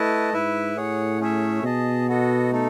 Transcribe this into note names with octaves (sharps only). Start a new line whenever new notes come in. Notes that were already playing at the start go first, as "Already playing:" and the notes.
Already playing: A3 E4 B4 D#5 A5
G#2 E4 B4 E5
A2 G#4 C#5 F#5
A3 C#4 G#4 C#5 E5
B2 G#4 D#5 A5
B3 F#4 A4 D#5
A3 D#4 A4